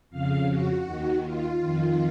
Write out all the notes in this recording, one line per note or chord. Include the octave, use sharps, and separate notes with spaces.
F2 C#3 F5
F#4
D#2 D#3
F4
F2 D#3